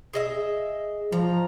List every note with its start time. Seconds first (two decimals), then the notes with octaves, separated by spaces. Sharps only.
0.13 G#4 D#5 E5
1.12 F3 A#5